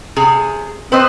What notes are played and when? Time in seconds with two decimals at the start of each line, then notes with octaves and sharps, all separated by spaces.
0.16 C3 G#4
0.92 C4 B4 C5 D#5